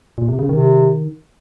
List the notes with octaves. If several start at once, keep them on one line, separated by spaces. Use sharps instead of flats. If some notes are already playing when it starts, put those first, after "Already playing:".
A#2
C3
C#3
C3 D#3